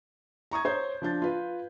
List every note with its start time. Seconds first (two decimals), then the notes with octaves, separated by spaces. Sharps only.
0.51 A#5 C#6 D#6 G#6
0.65 C5 C#5 C6 G6
1.02 F3 D4 G6 A6
1.22 F4 B4